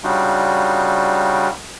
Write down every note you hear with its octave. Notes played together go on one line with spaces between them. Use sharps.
C#3 G3 D4 D#4 F4 F#4